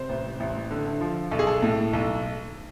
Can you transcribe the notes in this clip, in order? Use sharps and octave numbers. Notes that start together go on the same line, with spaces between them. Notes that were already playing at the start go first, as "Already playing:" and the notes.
Already playing: C3 C5
A1
A1
D3
F3
B1 A4
G#4
A4
A2
B1 A4